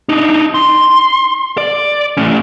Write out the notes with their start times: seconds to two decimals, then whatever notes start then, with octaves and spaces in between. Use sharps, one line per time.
0.09 D4 D#4
0.55 C6
1.58 D5
2.17 A2 C#4